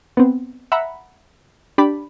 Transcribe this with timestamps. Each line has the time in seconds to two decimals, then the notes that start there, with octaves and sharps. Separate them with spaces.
0.17 B3 C4
0.72 E5 F#5 A#5 B5
1.78 D4 G4 D5 B5